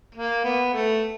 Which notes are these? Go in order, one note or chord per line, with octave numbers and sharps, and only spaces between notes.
A#3
B3
A3